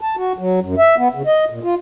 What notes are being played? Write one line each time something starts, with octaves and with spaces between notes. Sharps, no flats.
A5
F#4
F#3
F#2
E5
B3
C#3
D#5
A#2
F4